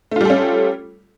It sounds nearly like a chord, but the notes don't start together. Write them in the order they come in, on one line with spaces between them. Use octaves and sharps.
A3 F4 G3 A4 C#4